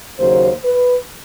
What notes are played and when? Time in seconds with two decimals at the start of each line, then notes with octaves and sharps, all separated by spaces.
0.18 D#2 C#3 F#3 A#3 C5
0.64 B4